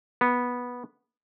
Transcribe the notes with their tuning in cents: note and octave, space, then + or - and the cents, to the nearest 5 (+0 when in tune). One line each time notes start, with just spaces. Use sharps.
B3 -10